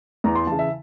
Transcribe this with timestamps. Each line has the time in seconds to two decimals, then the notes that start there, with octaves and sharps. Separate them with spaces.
0.24 E2 A#5
0.35 C6
0.47 C#3 E3 A5
0.59 E5